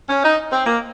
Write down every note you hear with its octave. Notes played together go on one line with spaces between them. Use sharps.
C#4
D#4
C4
A#3